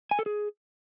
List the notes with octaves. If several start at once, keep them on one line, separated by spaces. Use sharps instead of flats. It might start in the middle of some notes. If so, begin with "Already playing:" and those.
G#5
A4
G#4